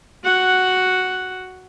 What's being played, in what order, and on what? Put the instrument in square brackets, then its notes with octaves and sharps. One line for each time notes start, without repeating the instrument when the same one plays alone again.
[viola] F#4 F#5